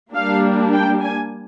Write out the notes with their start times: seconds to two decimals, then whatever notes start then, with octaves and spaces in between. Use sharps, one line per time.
0.14 G3 A#3 D4 F5
0.73 G5
1.03 G#5